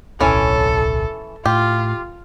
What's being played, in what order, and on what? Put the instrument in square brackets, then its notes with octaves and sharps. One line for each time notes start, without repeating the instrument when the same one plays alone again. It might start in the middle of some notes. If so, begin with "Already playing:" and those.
[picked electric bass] D1 B1 [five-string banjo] E3 C#4 C#5 [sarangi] A4
[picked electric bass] A2 [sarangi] F4 [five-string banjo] G4